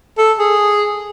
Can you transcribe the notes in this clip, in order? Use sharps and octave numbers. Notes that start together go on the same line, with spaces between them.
A4
G#4